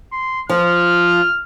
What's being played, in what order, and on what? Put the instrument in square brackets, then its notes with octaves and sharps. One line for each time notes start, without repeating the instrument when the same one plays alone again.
[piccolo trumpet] C6
[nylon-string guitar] F3 [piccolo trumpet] F6